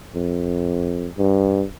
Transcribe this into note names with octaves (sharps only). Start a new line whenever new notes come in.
F2
G2